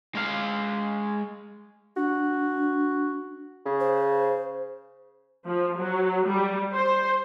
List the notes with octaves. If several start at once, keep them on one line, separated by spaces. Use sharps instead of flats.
G#3 F5
D4 F#4
C#3
C5
F3
F#3
G3
C5